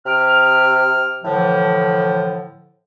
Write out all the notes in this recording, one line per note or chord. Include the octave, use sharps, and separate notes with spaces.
C3 D6 F6
A2 D3 E3 F3